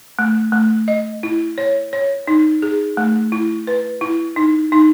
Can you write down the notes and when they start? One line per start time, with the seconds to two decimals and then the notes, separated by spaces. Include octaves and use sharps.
0.19 A3
0.52 A3
0.88 D#5
1.23 E4
1.58 C#5
1.93 C#5
2.27 D#4
2.62 G#4
2.97 A3
3.32 E4
3.67 B4
4.01 E4
4.36 D#4
4.72 D#4